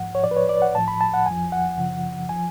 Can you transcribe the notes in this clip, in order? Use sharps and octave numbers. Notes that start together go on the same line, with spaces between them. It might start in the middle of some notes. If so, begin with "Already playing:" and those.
Already playing: G#2 F3 F#5
C#5
A2 F3 D5
B4
C#5
D5
F#5
A2 F3 A5
B5
A5
F#5
F2 F3 G#5
F#5
F#2 C#3 F3
F3 G#5